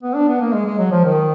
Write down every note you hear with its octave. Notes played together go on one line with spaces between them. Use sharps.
B3
D4
B3
A#3
G#3
G#3
F#3
F3
D#3